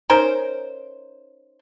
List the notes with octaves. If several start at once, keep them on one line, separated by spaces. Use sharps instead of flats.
C#4 D#4 A#4 C5